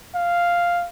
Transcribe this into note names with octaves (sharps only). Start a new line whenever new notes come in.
F5